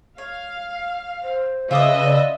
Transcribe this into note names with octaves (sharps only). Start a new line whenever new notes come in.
C#5 F5
C5
C#3 F4 B4 D#5 E5 D6 D#6
D5